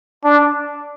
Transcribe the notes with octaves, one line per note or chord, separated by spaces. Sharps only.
D4